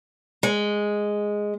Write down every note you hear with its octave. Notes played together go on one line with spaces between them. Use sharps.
G#3